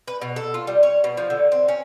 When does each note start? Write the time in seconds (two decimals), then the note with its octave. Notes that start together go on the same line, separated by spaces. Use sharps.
0.08 B4
0.22 B2
0.36 A4
0.54 F4
0.67 G3
0.83 C#5
1.04 B2
1.17 F3
1.30 D3
1.52 C4
1.68 C#4